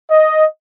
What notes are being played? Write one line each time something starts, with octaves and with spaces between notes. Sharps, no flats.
D#5